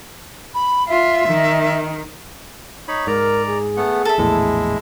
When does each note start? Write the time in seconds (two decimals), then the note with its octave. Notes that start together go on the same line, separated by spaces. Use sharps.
0.54 B5
0.88 F4 E5
1.28 D#3
2.88 D#4 C#5 B5
3.07 G#2 A#4 D5 A#5
3.47 G#4
3.77 A3 B3 F#5
4.05 A4 E5
4.18 A#1 E2 A2 G#3 E4